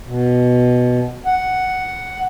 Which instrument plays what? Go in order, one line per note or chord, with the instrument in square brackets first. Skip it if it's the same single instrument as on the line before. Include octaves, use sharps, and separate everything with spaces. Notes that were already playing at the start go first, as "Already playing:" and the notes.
[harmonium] B2
F#5